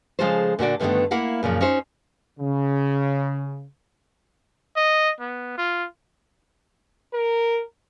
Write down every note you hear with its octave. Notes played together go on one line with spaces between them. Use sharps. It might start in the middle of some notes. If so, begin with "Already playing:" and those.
C#3 F3 G#3 F4 A4 C5
A#2 D3 F#4 D5
G2 D3 D#3 G3 A3 B3
A#3 E4 A#4 F5 F#5
F#2 A#2 C#3 F3
C#4 D#4 F#4 C5
C#3
D#5
B3
F4
A#4